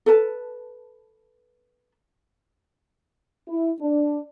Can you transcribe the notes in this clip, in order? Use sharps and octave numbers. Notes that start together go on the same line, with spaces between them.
A4 B4 A5
E4
D4